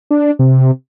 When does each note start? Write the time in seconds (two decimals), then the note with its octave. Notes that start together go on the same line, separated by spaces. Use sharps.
0.11 D4
0.39 C3